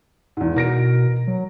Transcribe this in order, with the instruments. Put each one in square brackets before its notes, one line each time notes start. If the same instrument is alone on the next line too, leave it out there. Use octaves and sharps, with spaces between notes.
[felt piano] E2 G#2
[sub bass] B2 [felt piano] A#4 A#6 D7
[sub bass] F#3